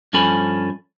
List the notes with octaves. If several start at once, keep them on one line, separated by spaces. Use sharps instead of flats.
G2 F3 C#4 A4 G#5 B5